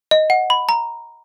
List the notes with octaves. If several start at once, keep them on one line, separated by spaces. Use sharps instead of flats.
D#5
F#5
B5
A#5